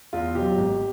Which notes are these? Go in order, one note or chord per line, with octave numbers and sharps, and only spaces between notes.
E2 F4
B2 F#3 G4
G#1